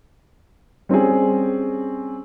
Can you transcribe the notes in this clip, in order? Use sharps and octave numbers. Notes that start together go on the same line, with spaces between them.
G3 C4 C#4 G#4